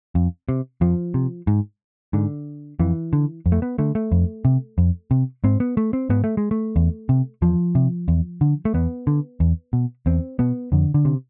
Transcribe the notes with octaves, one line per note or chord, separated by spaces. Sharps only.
F2
C3
F2 F3
C3
G#2
G#2 D3
F2 E3
D3
F2
A3
B3
D3 A3
A3
F2
C3
F2
C3
G#2 C4
B3
A3
C4
G#2 B3
A3
G#3
A3
E2
C3
E2 F3
C3
E2
D3
A3
E2 B3
D3
E2
B2
E2 C4
B2 B3
F2 D3
D3
C3